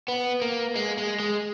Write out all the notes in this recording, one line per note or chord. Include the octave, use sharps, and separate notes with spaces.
B3
A#3
G#3
G#3
G#3